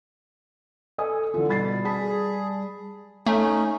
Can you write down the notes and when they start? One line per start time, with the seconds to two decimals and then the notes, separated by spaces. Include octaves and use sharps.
0.98 A4 D#5 G#5 D#6
1.34 D3 E3 F4 A4
1.49 B2 G3 B5 A6 C7
1.85 G#4 A5 B5 B6
3.26 A3 C#4 D#4